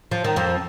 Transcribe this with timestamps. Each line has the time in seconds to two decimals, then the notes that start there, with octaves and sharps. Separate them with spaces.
0.11 F3
0.24 D#3
0.36 F2 F3